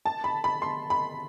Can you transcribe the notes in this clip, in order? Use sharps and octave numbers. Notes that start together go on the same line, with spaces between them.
A5
B5
B5
C6
B5